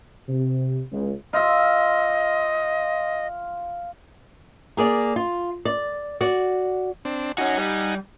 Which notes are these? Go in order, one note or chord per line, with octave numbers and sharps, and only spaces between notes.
C3
C#2
F4 D#5 E5
A#3 G#4 D5
F4
D5
F#4 D5
C4 D4
C#4 D#4 F#4 F#5 G#5
G3